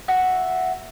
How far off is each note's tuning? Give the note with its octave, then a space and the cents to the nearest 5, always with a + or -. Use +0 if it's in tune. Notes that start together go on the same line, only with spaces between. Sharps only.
F#4 +0 E5 +0